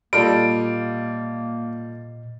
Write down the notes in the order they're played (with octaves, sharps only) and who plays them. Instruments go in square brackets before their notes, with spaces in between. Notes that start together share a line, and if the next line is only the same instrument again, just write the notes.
[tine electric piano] A#2 D#5 [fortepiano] G3 F4 A4 [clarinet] A#3 [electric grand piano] D7